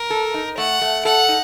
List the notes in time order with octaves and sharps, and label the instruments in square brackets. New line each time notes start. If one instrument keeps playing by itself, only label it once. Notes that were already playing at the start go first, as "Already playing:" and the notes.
Already playing: [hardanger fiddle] A#4
[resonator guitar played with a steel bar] A4
D#4
[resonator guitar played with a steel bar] A3 [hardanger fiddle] F#5
[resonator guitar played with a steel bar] A3
[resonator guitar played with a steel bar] A4 [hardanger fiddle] F#5
[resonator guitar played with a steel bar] D#4